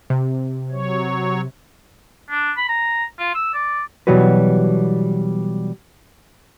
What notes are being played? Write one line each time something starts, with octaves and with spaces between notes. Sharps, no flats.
C3
F#3 C#5
D4
B5
A#5
F4
E6
D5
B2 E3 F#3 G3 F#4 B4